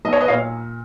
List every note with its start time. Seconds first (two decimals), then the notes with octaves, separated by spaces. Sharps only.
0.05 B1 D#5
0.13 C#5
0.20 B4 D#5
0.28 A#2 C#5 F5